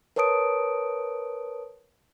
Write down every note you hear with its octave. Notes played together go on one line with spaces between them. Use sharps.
A#4 B4 C#5 A5 D#6 D7